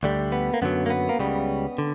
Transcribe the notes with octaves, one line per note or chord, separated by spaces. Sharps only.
D2 D3 G3
B3
A#3
F#2 D3 F#3 B3
A#3
B3
A#3
C#2 C#3 G3 B3
D3